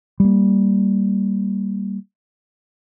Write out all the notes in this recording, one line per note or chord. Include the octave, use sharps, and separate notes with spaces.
G3 A#3